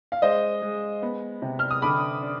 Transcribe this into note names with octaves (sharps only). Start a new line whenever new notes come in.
F5
G#3 C5 D#5
G#3
B3
C3
F6
D#6
D3 B5 D6
D4